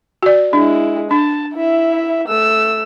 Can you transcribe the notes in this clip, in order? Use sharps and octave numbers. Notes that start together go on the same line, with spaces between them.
F#4 D5
G#3 D4 E4
D4 A5
E4 E5
A3 E6